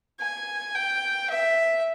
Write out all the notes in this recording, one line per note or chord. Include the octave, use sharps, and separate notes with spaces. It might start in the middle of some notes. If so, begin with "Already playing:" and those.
G#5
G5
E5